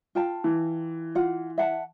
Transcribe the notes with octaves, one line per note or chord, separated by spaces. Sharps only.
F4 G5 A5
E3
F4 F#5
E5 F#5 A5